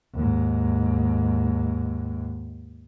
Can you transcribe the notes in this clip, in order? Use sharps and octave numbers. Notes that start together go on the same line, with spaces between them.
D#2 G#2